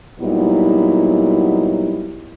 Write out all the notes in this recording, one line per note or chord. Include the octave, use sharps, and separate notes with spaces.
A#2 F#3 G3 B3 D#4 E4